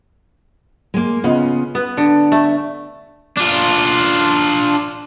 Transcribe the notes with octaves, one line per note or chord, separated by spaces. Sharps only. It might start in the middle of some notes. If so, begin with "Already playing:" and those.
G#3 A#3
C#3 B3 F4 D#5
B3
D3
A3
D4 F4